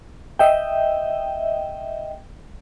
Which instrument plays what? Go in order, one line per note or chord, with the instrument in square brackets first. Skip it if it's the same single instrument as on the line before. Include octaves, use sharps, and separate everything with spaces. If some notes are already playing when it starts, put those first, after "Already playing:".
[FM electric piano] D#5 E5 G5